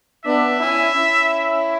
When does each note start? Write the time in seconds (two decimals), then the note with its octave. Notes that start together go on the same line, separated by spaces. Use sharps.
0.25 B3 D4 E5
0.59 C#4 E4
0.94 C#4 E4